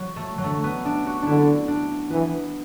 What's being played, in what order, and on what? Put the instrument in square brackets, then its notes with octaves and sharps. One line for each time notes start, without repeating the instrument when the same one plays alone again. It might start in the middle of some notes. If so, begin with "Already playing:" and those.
Already playing: [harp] F#3
A3
F#3
[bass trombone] D3 [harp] A3
[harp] B3
D4
F#4
[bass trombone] D3 [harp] D4 E4
[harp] D4
[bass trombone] E3 [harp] B3